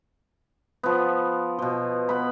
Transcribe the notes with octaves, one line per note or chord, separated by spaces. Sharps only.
F3 B3
B2 F3
B3 B5